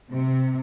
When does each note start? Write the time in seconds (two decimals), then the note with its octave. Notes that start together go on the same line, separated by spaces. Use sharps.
0.11 C3